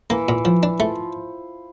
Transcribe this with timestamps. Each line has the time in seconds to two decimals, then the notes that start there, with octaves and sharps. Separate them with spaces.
0.10 E3 A#3
0.29 A#2
0.45 F3
0.63 D4
0.79 F3 A3